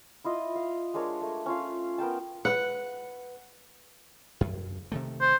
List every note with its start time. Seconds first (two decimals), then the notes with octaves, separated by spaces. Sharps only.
0.25 E4 F4 D#5
0.56 F5
0.94 G#3 D4 A#4 C#5
1.21 A3
1.46 C#4 F4 F5
1.98 B3 A#4 G5 A5
2.45 B4 F#5
4.41 F#2
4.92 C3 D#3 A3
5.21 C5